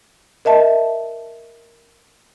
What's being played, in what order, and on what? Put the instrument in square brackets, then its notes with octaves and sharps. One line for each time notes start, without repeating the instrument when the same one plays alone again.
[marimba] A#4 D#5 E5 A5